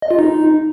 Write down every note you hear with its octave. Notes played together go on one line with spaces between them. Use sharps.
D#5
F4
D#4